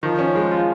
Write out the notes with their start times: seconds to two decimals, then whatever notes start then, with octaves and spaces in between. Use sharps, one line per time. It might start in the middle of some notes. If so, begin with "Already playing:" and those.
0.03 D#3 F3
0.19 C#4
0.35 G#3
0.51 F4